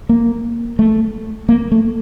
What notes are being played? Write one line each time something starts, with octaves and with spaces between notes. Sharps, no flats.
A#3
A3
A#3
A3